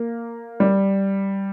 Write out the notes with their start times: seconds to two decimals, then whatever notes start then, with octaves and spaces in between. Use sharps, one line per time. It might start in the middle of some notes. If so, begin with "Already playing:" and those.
Already playing: A#3
0.60 G3